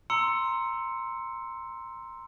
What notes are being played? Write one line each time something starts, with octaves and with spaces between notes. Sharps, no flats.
A#5 C6 E6 C#7